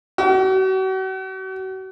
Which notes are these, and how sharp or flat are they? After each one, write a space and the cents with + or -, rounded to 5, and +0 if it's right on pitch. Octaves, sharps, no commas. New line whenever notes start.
F#4 +40